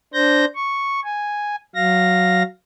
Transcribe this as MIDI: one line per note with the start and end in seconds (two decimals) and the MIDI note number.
0.14 0.45 62
0.14 0.45 72
0.14 0.45 91
0.14 0.45 94
0.55 1.00 85
1.04 1.56 80
1.75 2.43 54
1.75 2.43 77
1.75 2.43 94